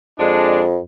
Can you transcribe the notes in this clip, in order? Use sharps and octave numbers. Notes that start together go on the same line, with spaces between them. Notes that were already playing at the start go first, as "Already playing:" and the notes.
F2 G#3 D4